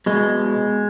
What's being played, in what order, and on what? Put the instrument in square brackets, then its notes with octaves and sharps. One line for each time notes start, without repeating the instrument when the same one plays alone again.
[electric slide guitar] B2 G#3